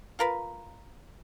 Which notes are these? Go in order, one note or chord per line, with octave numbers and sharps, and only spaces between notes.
F4 A#4 B4